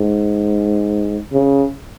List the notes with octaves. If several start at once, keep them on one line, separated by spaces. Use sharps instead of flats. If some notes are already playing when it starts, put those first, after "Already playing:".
Already playing: G#2
C#3